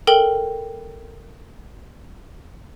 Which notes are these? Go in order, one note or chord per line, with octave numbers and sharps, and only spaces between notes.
A4 A#4 G5 F#7 G7